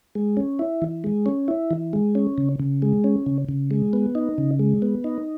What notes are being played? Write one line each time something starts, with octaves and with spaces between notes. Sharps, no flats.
G#3
C#4
E4
E3
G#3
C#4
E4
E3
G#3
C#4
C#3
C#3
G#3
C#4
C#3
C#3
G#3
B3
D#4
C#3
G#3
B3
D#4